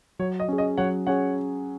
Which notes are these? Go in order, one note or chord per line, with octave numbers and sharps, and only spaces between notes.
F#3 C#5
D#5
C#4 G#4
D#5
F#3 C#5 F#5
C#4 G#4 C#5 F#5